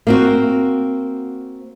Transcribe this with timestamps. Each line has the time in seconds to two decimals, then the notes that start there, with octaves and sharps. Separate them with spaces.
0.07 A#3 C4 F#4